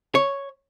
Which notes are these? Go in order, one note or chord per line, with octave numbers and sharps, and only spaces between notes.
C#5